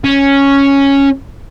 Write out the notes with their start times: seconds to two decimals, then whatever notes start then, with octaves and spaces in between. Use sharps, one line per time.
0.04 C#4